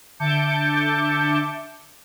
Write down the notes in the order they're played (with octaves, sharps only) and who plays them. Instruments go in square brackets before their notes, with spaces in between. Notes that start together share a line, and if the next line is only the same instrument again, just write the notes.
[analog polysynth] D3 E5 A5 D6 G6 C#7